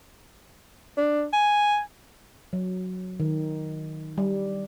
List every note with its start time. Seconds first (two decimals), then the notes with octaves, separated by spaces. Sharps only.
0.97 D4
1.33 G#5
2.53 F#3
3.20 D#3
4.18 G3